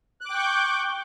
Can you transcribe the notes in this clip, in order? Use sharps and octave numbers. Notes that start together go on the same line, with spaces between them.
G5 C#6 D6 F#6 G6